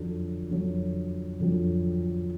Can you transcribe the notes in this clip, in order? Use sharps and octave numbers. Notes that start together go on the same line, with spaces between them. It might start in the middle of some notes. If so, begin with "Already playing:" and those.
Already playing: F2 D3 F#3
F2 D3 F#3
F2 D3 F#3